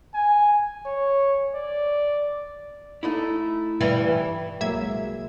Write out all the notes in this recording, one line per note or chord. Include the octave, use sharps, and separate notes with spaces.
G#5
C#5
D5
A3 D#4 E4
G2 E3 G3
C2 F#3 G#3 A#3 E5 G#6